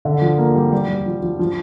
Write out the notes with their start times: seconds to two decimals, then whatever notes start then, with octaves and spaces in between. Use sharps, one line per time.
0.05 D3
0.22 F3
0.38 A#3
0.55 G3
0.72 G3
0.88 G3
1.06 F3
1.22 F3
1.39 F3